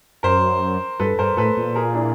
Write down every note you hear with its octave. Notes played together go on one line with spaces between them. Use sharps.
F#2 A#4 C5
G2 A4 B4
G2 A#4 C5
A2 A4 B4
A#2
G#4 A#4
D4 E4